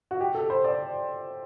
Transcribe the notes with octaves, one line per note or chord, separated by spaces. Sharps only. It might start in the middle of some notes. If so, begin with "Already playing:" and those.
F#4
G4
A4
C5
D5